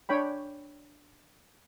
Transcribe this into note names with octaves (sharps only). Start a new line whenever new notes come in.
D4 C#5 G5 B5